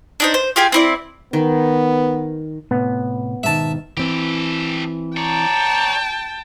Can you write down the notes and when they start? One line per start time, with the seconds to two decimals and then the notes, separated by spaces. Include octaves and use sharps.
0.20 D4 D#4 C5
0.34 C5
0.56 F4 G4 G#4 G#5
0.72 C4 E4 D5
1.33 D#3 B3
2.71 A2 C3 B3
3.43 G#2 B2 D#3 E5 A5
3.97 E3 C4 G4 A4
5.17 C#5 D5 G5 A5 A#5